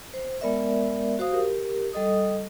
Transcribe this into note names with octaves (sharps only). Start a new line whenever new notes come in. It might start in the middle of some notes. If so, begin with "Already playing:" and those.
C5
G#3 B3 A#4 D5 E5
F#4 C5 F5 D#6
G4 A#4
G3 A4 D#5 D#6